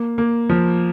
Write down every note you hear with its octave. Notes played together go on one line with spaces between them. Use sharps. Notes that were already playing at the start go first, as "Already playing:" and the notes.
Already playing: A#3
A#3
F3